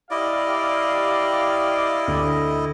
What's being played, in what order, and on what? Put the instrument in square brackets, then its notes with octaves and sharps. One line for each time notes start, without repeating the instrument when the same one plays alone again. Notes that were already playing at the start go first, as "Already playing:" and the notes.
[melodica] E4 D#5 [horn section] G4 D5 F5
[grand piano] D2